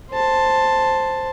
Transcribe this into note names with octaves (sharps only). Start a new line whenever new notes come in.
C5 A5